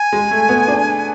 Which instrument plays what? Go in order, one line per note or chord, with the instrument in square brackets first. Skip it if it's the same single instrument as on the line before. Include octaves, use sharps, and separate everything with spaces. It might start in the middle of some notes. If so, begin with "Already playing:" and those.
Already playing: [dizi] G#5
[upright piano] G#3
A3
B3
D4